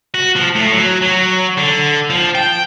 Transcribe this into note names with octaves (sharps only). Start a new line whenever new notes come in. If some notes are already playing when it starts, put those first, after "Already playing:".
F#4
F3
A2
F#3
F#3
D3
F3
G5